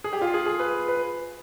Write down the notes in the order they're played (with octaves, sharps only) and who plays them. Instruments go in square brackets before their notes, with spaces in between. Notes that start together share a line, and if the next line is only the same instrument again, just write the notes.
[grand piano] G#4
G4
F4
G#4
G#4
B4
B4